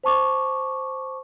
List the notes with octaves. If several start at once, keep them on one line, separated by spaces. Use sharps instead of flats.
C5 A5 C#6 D6